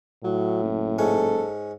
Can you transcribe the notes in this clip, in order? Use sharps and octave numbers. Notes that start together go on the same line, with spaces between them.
A2 F#3
F#1
G#2 C#4 A4